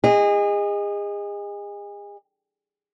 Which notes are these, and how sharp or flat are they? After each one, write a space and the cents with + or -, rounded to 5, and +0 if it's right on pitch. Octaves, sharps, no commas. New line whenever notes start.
G#4 -35 D#5 -5